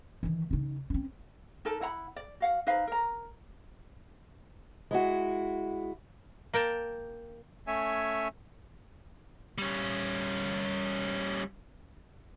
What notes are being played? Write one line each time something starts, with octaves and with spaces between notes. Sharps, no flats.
D#3 E3
C#3 D#4
C4 C#4
D#4 A4 A#4 A5
E4 F#5 A#5 B5
D5
F#4 F5 F#5
D#4 B4 C5 F5
A#4 A#5
G#3 E4 F#4
A#3 A#4 G5 A5
A3 C#4 C#5 E5 G#5
G3 C#4